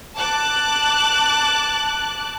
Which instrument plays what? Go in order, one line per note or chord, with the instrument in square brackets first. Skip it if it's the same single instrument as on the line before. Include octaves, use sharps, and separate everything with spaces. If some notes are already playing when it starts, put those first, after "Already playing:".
[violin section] A5 D6 F#6